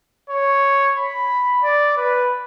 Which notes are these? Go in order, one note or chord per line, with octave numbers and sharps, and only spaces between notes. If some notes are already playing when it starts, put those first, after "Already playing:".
C#5
B5
D5
B4